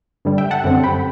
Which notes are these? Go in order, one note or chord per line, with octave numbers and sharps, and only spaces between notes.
G2 D3 G3
E5 G5
F#5 A5
F#2 D3 G3 C4
G5 B5